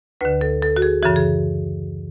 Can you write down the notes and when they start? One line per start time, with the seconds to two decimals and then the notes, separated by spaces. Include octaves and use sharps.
0.21 D2 D3 B4
0.41 A4
0.62 A4
0.76 F#4
0.82 G#4
1.03 F#2 C#3 E3 F#4
1.16 G#4